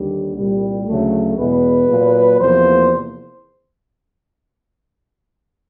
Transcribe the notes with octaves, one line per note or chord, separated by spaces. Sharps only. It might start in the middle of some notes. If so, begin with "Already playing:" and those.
Already playing: D#2 D3 G3
C2 A#2 G3
D2 C#3 F#3 A3
E2 B2 G#3 B3 B4
A#2 F#3 A#3
E2 C3 F3 A#3 C5